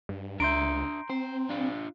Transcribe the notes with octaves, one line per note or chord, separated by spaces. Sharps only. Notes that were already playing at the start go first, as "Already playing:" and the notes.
G2
C#2 D4 E5 A#5 C6 G6 D7
C4 C5
D4 F4